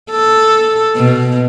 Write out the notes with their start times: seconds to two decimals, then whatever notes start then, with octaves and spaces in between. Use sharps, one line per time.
0.11 A4
0.96 B2